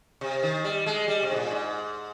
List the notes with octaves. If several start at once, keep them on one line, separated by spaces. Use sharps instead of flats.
C3
D#3
G3
G#3
G3
C3
G#2
A#2
G#2